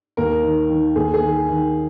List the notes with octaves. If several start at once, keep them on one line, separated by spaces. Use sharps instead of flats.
D#2 A#4
D#3
D#3
D#2 G#4
G#4
D#3
D#3